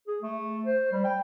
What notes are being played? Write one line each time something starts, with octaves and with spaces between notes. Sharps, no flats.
G#4
A3
C5
G3
G5